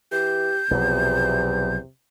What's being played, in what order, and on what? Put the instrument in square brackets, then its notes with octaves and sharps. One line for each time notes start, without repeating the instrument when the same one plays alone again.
[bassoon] E3 [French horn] G4 [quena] G6
[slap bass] B1 F3 F#3 [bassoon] E2 [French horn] C3